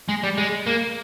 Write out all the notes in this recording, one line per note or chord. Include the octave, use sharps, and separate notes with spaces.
G#3
G3
G#3
A#3